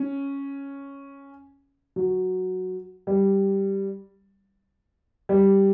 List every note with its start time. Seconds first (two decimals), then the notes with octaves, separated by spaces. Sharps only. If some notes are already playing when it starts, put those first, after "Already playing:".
Already playing: C#4
1.96 F#3
3.07 G3
5.29 G3